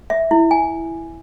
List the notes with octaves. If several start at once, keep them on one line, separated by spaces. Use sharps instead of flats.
E5
E4
G#5